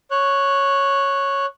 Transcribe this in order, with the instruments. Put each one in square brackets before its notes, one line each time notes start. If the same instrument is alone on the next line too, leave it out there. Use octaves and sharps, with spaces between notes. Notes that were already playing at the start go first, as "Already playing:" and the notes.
[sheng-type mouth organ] C#5 F#6